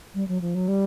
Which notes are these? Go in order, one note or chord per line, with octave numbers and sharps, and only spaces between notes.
G3
F#3
F3
F#3
G3